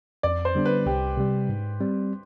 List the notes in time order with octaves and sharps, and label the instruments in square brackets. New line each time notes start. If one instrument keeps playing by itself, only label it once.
[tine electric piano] F2 [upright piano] D5
[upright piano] C5
[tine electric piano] D3 G3 B3 D4
[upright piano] B4
[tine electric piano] C2 [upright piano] G4
[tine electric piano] C3 G3
G#2
G3 C4